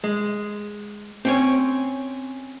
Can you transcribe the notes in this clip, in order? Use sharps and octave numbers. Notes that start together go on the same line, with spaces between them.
G#3
C4 C#4 C#5